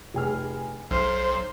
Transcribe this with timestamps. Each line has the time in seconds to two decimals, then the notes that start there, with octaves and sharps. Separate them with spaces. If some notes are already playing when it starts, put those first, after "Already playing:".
0.14 F1 G#4 F6
0.91 B1 C5 F6